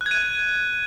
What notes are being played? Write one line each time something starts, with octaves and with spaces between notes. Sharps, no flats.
F#6
G#6
D#7